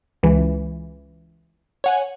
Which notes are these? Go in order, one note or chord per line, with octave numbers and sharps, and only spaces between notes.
C#2 E3
C#5 F#5 G#5